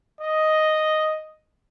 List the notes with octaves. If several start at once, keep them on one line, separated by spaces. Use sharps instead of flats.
D#5